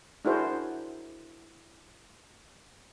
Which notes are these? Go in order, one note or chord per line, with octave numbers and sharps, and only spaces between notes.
D4 E4 F#4 G#4 A#4 C5